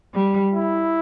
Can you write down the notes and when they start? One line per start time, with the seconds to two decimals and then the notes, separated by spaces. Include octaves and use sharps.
0.13 G3
0.54 E4